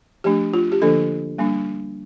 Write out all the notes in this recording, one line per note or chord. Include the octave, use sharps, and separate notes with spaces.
F3 A3 D4 G4
F4
G4
D3 F3 A#3 D4 A4
G3 A#3 D4